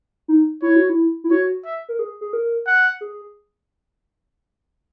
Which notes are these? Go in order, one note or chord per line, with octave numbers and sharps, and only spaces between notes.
D#4
E4 C#5
F#4
E4
E4
F#4 C#5
E5
A#4
G#4
G#4
A#4
F#5
G#4